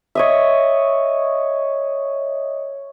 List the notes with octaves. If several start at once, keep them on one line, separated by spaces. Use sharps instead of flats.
C#5 D#5 E5